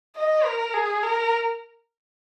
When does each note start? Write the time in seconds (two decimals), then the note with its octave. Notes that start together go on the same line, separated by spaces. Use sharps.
0.16 D#5
0.45 A#4
0.74 G#4
1.03 A#4